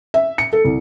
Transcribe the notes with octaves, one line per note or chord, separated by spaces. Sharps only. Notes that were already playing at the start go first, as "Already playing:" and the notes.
E5
C#7
A4
C2